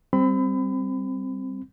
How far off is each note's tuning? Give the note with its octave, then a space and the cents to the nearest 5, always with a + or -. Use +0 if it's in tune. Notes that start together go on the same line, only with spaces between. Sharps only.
G3 +0 C4 +0 B5 +30